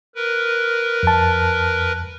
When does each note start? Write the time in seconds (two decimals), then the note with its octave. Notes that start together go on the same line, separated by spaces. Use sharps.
0.15 A#4 B4
1.03 F2 A5